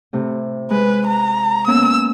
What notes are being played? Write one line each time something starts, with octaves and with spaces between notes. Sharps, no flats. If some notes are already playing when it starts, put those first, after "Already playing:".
A2 C3 A3
G#3 B4
A#5
A#3 B3 C#4 E6